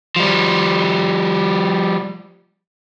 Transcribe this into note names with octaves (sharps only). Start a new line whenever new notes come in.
F3 G3